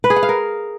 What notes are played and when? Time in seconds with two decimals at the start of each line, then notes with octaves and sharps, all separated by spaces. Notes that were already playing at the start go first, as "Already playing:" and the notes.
0.04 B4
0.10 G#4
0.16 F#5
0.23 F5
0.29 A#4